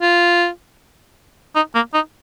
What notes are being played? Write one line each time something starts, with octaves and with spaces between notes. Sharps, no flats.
F4
D#4
A#3
D#4